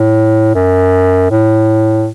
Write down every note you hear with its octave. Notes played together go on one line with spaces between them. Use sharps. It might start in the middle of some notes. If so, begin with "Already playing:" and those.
Already playing: A2
F#2
A2